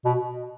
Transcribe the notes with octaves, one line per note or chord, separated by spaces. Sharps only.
B2